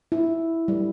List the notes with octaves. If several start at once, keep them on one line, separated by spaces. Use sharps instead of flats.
E4
G3